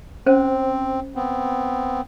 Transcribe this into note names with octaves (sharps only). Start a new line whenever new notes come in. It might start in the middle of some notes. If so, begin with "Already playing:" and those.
C4 C#4 C5
B3 C4